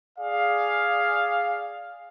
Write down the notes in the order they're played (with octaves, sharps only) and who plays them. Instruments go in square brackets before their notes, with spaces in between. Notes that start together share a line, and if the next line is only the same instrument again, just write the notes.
[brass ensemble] G#4 D5 F5